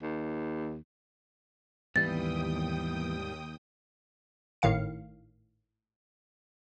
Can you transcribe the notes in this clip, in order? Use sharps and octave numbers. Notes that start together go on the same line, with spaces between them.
D#2
D#2 G#2 E3 G3 B3 G5 D#6 A6
G#1 A2 D#3 F5 C#7